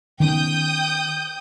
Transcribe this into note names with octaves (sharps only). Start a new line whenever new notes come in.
D#3 B3 C#4 G5 D#6 G6